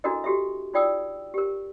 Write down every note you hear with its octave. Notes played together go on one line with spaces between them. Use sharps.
D4 E4 F#4 A4 A#4 D#5
F#4 G4 A4 E5
D#4 F4 D5 G5 D#6 E6
G4 A#4